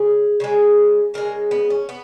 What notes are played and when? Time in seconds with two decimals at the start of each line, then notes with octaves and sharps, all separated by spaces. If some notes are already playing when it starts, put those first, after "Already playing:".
Already playing: C#3 G#4
0.40 C#3 F3 G#3
1.14 C#3 G#3 A#4
1.51 B3
1.70 C#4
1.89 B3